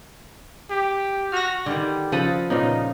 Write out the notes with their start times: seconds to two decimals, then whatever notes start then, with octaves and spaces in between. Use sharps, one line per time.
0.70 G4
1.32 F#4 F6 A#6
1.66 D3 D#3 G3
2.12 C#3 F3 A4 B4 D#6
2.50 A#2 C#3 F3 B3 D#4